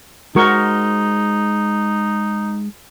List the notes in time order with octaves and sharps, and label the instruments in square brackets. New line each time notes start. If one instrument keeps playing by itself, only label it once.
[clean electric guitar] G#3 C5 [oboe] D#4 [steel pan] F#4 A#4 C#6